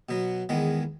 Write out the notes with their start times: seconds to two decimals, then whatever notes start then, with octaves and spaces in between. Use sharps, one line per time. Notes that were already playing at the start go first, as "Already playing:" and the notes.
0.09 B2 F#3 B3
0.49 E2 D#3 G#3 B3